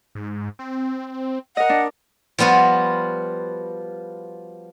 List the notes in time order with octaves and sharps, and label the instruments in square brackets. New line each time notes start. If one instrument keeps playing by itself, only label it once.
[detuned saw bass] G#2
C4
[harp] A#4 D#5 [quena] F#5
[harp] D4
[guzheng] F3 G3 B3 F4 F#4